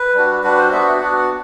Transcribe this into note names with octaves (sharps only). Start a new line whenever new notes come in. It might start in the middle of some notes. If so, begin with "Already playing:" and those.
Already playing: B4
G3 D4 F#4
G3 D4 F#4 B4
C5
B3 D4 F#4 E5
F#5
B3 D4 F#4 F#5